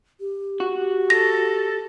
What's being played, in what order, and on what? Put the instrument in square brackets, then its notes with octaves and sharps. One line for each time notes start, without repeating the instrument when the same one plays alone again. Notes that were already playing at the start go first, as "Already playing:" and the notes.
[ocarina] G4
[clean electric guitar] F#4
[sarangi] A4 [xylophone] A#6